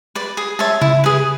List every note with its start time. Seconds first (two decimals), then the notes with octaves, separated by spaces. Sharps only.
0.15 B4 D5
0.37 G#4
0.59 C#5 E5 A5
0.81 C#3 E4
1.04 G#4 B4